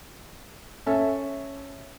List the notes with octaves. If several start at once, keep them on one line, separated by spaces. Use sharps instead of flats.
C#4 A4 E5